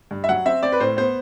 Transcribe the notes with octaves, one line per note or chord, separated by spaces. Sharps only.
G2
E5
F#3 F#5
C4 E5
C4 D5
B4
A2 C5
B3 C5